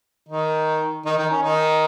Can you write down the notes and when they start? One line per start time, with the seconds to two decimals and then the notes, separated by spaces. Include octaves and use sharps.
0.28 D#3 D#4
1.05 D#3 D#4
1.18 D#3 D#4
1.31 C#4
1.43 D#3 D#4